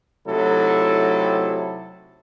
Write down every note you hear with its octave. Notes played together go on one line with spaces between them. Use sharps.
C3 F#3 A3 D#4 E4 A4